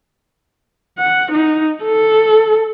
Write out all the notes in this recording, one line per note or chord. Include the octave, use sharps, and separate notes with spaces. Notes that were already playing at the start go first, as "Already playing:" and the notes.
F#5
D#4
A4